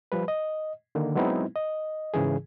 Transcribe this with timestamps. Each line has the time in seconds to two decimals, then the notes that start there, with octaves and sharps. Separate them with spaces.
0.12 F3 G3 B4
0.28 D#5
0.95 D3 D#3 A#3
1.15 F#3 G#3 B3 C4 D#4 E4
1.56 D#5
2.14 G#2 C#3 E3 G#4